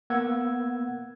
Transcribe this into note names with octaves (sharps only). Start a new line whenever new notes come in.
A#3 B3 F#5 E6 G#6